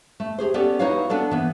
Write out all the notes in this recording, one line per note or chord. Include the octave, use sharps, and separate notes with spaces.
A3
G4 G#4 C5
B3 C#4 G4 A4 D5
D#4 E4 F#4 B4 C#5 F5
B3 D4 A4 D5
E3 B3